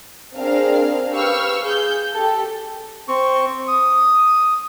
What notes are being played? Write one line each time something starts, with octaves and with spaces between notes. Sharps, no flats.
C4 D4 G#4 A#4 F5
G4 B4 F5 C#6 E6 F6
G#4 G6
G4 A4
C4 C#6
D#6